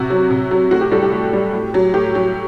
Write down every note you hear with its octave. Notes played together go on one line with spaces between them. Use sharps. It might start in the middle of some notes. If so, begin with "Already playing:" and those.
Already playing: C3 F#4
F#3
C3
F#3
A2 F#4
G4
G3 F#4 A4
G4
A2
G3
A2
F#3
A2 G4
F#3